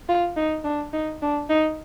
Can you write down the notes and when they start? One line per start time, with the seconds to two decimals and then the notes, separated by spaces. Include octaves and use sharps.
0.09 F4
0.37 D#4
0.64 D4
0.93 D#4
1.22 D4
1.50 D#4